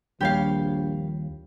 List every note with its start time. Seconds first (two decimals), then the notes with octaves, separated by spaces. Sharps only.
0.21 A#1 D#2 F3 G3 G4 C#5 F5